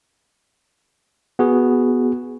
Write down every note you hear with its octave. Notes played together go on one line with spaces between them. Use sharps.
B3 F#4 G#4